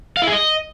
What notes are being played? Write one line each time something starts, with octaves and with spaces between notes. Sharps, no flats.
F5
E4
G#4
D#5